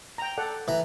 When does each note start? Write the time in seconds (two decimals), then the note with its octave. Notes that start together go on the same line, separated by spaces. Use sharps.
0.18 G5 A#5
0.37 A4 D5 F#5
0.68 E3 A#5